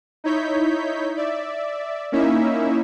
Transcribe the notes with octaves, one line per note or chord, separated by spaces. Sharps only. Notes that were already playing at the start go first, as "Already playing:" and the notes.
D#4 E4 C#5 G6 B6
D5 E5
A#3 C#4 D#4 E4 E5